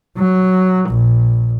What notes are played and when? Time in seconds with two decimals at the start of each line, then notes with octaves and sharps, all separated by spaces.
0.17 F#3
0.89 A#1